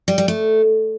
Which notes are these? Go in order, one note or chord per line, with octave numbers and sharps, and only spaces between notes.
G3
G3
A3